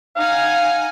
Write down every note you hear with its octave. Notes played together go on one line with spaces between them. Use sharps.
D#4 F5 F#5 G#5